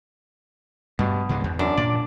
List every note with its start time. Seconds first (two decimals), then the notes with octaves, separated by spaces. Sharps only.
0.99 G2 B2 G3
1.29 C#2 G#2 G#3
1.44 E2
1.59 F#2 D4
1.78 A#2 D5